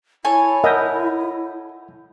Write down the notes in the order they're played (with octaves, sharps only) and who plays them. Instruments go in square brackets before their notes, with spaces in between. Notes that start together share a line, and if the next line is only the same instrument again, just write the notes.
[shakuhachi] E4 [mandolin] A4 C#5 G#5
[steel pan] A#4 D#5 E5 [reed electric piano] F#5 G6